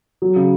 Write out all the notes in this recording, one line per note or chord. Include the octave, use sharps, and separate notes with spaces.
F#3
C#3